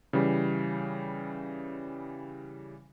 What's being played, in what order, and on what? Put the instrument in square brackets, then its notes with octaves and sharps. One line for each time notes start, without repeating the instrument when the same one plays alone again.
[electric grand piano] C#3 E3 G3